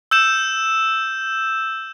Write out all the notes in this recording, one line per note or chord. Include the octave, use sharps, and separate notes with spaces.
E6 G6 E7